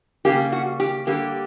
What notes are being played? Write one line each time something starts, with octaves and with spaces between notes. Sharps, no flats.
C#3 G3 A#3 G4
F#4
G4
D3 G3 A#3 G4